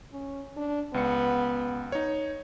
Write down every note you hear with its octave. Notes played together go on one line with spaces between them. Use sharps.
C#4
D4
C#2 B3 C#7
D#4 C#5